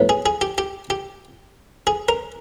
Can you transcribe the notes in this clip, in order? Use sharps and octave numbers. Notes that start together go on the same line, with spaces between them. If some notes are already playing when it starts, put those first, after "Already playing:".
Already playing: A2 F#3 B3
G#4
G#4
G4
G4
G4
G#4
A#4